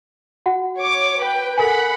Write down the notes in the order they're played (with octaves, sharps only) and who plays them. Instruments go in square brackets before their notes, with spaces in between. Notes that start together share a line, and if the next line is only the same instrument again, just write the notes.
[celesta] F#4 F#5
[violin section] C#5 D6
B4 G5
[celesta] A4 A#4 G#5 [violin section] F#5 B5